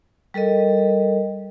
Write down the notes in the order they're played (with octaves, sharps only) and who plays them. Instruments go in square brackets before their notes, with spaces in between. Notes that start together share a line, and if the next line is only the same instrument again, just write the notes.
[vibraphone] G3 A4 A#4 D#5